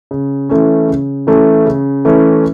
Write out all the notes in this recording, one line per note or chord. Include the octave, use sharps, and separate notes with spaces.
C#3
E3 A3 C#4
C#3
E3 A3 C#4
C#3
E3 A3 C#4